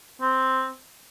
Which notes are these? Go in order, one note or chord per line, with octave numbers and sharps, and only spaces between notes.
C4